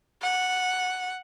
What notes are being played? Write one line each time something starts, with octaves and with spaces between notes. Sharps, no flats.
F#5